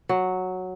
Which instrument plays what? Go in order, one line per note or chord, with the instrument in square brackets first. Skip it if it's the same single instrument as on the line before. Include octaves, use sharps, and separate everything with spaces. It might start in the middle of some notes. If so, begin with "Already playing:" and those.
[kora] F#3